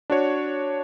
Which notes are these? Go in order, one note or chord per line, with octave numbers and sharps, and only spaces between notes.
D4 F#4 C#5